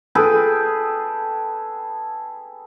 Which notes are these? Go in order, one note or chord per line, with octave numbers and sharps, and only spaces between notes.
G#4 A4 B4 G5